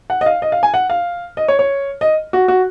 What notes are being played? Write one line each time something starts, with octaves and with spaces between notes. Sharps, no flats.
F#5
D#5
F5
D#5
F5
G#5
F#5
F5
D#5
C#5
C#5
D#5
F#4
F#4